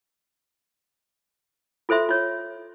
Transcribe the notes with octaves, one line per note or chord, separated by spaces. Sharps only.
F4 A4 C5 E5 C6
F4 C#5